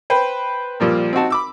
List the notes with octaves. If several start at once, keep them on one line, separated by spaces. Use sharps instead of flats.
B4 C5 G5
A#2 F3 G3 A#3
C4 D#4 F#4 A5
B5 D6 E6